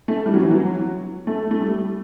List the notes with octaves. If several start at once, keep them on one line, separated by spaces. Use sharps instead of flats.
A3
G3
F#3
E3
F#3
A3
A3
G3